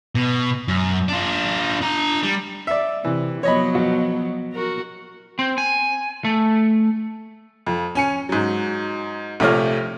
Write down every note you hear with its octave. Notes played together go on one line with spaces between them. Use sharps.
B2
F#2
D4 F4
D4 A#5
G3
D5 E5
C3 E3
F3 F#3 B3 C#5 D#5 B5
B2
F#4 A#4
C4
G#5
A3
F2
C#4 G#5 C#7
G#2 F#3
A#1 C3 A3 F4 C#5 F6